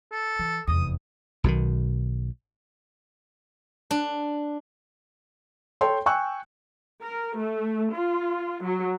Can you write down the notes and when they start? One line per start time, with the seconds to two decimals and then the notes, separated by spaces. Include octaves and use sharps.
0.12 A4
0.39 E3
0.67 F1 E2 D#6
1.44 B1 B2 D3 D#3
3.91 D4
5.81 A4 C#5 G5 C6
6.06 G5 G#5 C#6 E6 F#6
7.02 A#4
7.38 A3
7.94 F4
8.64 F#3